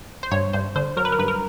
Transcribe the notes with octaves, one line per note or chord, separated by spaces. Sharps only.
C5
G2 C#5
G2 C5
D3 C5
F#3 A#4
B4
A#4
G2 B4
A#4